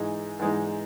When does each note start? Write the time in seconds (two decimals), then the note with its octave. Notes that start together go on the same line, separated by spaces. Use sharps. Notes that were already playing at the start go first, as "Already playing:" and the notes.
Already playing: G#2 E3 G#3 D#4
0.39 G#2 E3 G#3 D#4